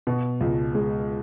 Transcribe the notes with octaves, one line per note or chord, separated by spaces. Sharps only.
B2
C#2
G#3